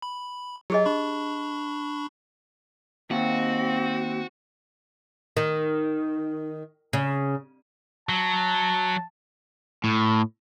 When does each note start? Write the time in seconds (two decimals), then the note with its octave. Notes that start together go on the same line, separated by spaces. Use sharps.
0.02 B5
0.70 F#3 G4 G#4 D#5
0.85 D4 B5 C#6
3.11 D#2 C4 F#4
5.37 D#3
6.93 C#3
8.09 F#3 A5
9.84 A2